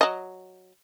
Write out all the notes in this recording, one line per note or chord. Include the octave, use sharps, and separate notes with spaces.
F#3 D#5